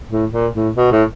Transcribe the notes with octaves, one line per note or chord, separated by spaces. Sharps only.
A2
A#2
A2
B2
A2